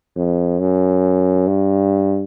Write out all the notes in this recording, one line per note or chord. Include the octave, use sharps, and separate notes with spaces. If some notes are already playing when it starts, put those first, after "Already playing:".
F2
F#2
G2